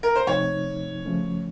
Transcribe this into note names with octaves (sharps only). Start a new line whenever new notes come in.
A#4
C5
C3 F3 A3 C4 D#4 C#5
C#3 F3 A3 C#4